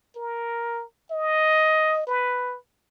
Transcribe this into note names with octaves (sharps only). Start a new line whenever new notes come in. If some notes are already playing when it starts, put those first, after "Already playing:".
A#4
D#5
B4